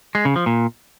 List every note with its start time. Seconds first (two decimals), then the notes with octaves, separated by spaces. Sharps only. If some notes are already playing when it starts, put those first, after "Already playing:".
0.15 G#3
0.25 C#3
0.36 F3
0.46 A#2